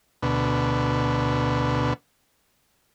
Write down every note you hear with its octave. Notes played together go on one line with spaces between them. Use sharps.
D2 B2